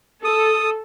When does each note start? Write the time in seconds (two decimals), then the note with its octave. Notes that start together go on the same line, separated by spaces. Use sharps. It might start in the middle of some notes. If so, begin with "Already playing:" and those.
0.25 A4 D#6